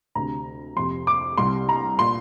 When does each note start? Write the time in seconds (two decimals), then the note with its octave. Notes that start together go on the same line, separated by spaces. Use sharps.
0.15 D2 C3 A#5
0.77 F2 C3 C6
1.07 D6
1.38 C2 C3 C6
1.69 A#5
1.99 A#2 C6